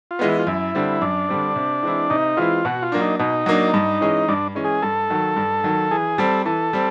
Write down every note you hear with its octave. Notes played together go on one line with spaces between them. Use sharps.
F4
E3 G#3 B3
E4
F4
F#2 E4
D3 G3 C4
F#2 D4
D3 G3 C4
C3
E3 G#3 C4 E4
C3 D#4
E3 G#3 C4 E4 F4
B2 F#4
F4
F#3 A#3 D4
D#4
B2 D#4
F#3 A#3 D4
G2
E3 G#3 C#4
G2 D4
E3 G#3 C#4
G#4
G2 A4
D#3 F#3
G2
D#3 F#3
E3 G#4
G3 C4 A4
E3 A4
G3 C4